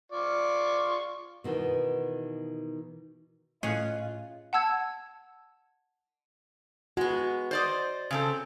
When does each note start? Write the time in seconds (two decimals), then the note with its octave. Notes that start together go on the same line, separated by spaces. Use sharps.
0.12 F4 D5 C#6
1.44 B2 D#3 E3 B3
3.63 A2 C#4 F4 G#4 D#5 F#6
4.53 F#5 A5 E6 G#6
6.97 G#3 B3 F#4
7.51 C5 D5 D#5
8.11 C#3 C4 A4